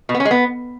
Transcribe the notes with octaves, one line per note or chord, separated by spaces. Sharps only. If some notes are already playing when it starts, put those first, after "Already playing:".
B2
B3
C#4
G#3
B3